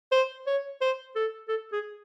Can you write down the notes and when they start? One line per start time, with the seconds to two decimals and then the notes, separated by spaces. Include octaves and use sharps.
0.11 C5
0.46 C#5
0.81 C5
1.15 A4
1.48 A4
1.72 G#4